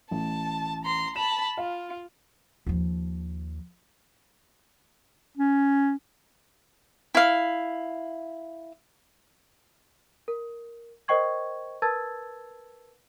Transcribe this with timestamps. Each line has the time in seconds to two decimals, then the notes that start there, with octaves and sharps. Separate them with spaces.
0.11 A1 A5
0.84 A#5 C6
1.16 A5 B5 E7
1.57 F4 F5
2.66 D#2 F3
5.38 C#4
7.15 E4 F5
10.28 A#4
11.08 A#4 C5 D#5 G5 C#6 G#6
11.82 A#4 B4 A5 E6 G#6 A6